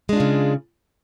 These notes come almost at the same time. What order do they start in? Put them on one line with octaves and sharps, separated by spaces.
G#3 D4 F4 C#3